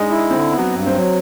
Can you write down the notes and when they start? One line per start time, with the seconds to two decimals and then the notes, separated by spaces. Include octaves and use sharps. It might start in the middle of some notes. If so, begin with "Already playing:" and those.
Already playing: G#3 D4 D#4 D#5
0.10 E4
0.30 D3 C4 C5
0.51 B3
0.58 F#3 F#4
0.73 G2
0.87 C4 C5
0.94 F#3